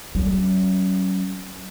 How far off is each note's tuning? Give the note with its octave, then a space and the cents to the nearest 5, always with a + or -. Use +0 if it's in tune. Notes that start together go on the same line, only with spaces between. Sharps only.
F#3 +35 C#4 +0